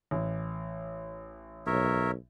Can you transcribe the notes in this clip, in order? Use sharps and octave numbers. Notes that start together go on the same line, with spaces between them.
A1
B1 A#4 C#5 E5